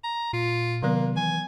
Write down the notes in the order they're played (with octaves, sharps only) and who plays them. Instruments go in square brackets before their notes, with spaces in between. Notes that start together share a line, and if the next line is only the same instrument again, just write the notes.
[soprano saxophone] A#5
[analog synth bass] A#2 [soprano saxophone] F4
[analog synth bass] C3 [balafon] D#3 F#3 B3 [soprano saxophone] A#3
[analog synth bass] E3 [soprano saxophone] G#5